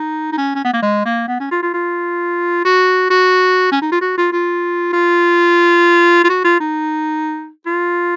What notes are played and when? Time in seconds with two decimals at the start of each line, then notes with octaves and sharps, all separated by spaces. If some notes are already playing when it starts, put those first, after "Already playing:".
Already playing: D#4
0.32 D#4
0.38 C#4
0.56 C#4
0.65 B3
0.73 A#3
0.82 G#3
1.05 A#3
1.28 B3
1.40 C#4
1.51 F4
1.62 F4
1.74 F4
2.65 F#4
3.10 F#4
3.72 C#4
3.82 D#4
3.92 F4
4.01 F#4
4.18 F4
4.33 F4
4.93 F4
6.24 F4
6.29 F#4
6.44 F4
6.60 D#4
7.66 F4